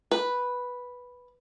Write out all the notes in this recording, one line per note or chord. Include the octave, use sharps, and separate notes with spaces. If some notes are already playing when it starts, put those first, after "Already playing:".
B4